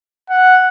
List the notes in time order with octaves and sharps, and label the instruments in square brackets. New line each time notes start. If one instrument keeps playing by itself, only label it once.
[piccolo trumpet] F#5